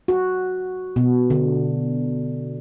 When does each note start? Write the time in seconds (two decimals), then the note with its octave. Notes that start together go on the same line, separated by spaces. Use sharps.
0.08 F#4
0.96 B2
1.30 D3